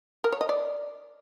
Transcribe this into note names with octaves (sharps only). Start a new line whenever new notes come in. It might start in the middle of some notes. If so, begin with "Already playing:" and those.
A#4
C#5
D#5
D5